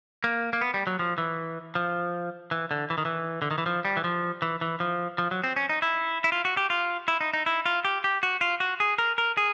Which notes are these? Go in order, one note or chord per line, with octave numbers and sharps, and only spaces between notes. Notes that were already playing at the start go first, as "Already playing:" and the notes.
A#3
A#3
B3
G3
F#3
F3
E3
F3
E3
D3
E3
D#3
E3
D3
D#3
E3
F3
G3
E3
F3
E3
E3
F3
F3
F#3
C4
C#4
D#4
E4
E4
F4
F#4
G4
F4
E4
D#4
D#4
E4
F4
G4
G4
F#4
F4
F#4
G#4
A#4
A#4
G#4